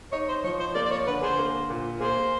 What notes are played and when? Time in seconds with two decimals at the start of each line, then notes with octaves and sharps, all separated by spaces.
0.13 D#4 C#5
0.29 C5
0.44 F3 C#5
0.60 C5
0.75 A#3 D5
0.86 D5
0.91 C#5
1.07 D3 B4
1.22 G#4 C5
1.38 A#3
1.70 A#2
2.00 A#3 G#4 C5